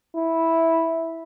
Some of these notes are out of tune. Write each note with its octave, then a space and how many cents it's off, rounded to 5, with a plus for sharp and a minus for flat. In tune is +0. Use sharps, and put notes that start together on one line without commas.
E4 -10